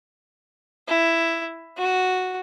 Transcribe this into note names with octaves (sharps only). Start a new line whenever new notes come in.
E4
F#4